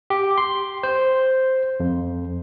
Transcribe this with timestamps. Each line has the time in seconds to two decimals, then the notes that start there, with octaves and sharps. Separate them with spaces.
0.10 G4
0.38 C6
0.83 C5
1.80 F2